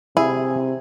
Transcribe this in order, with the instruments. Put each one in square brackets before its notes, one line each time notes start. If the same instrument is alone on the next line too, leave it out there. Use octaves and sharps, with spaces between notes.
[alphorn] C3 [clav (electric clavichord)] E4 [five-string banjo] G#4